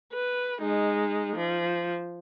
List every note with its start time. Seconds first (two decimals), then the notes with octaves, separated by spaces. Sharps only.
0.13 B4
0.61 G#3 D#4
1.36 F3